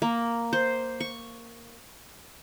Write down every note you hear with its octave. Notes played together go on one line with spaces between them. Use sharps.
A#3
C5
C#6